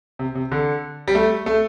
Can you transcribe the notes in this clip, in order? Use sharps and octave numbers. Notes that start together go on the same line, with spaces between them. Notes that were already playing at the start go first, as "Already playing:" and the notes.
C3
C3
D3
G3
A3
A3